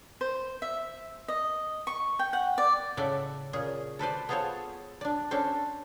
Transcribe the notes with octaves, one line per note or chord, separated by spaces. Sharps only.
C5
E5
D#5
C#6
G5
F#5
D5
A2 C#3 A4 D5 E5 F#5
A#2 C#4 G#4
A4 B4 C5 D5
B3 F4 G#4 A4 C5 C#5
D4 D5
C#4 D4 A4 C5